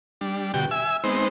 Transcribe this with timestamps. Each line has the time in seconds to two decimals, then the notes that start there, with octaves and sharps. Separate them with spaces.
0.21 G3 D4
0.54 B2 D3 F#4 G4 G5
0.71 E5 G#5 E6
1.04 G#3 B3 C4 D#4 C5